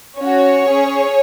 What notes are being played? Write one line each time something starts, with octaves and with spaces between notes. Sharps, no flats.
C#4 F#4 C#5
C#4 G#4